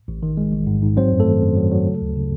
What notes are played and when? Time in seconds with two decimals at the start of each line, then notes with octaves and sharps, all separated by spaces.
0.08 A1
0.23 D#3
0.37 G#3
0.52 A1
0.67 G#2
0.83 G#2
0.97 F#3 C4 C5
1.12 F#2
1.20 A3 A4
1.27 D#3
1.41 F#2
1.56 F#3
1.72 F#3
1.86 C#3
2.02 D2
2.16 C#3